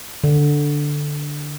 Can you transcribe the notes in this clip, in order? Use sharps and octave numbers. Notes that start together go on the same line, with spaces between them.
D3